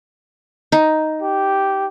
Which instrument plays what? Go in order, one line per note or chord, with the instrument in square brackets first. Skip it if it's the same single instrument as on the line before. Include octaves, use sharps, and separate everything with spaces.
[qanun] D#4
[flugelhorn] G4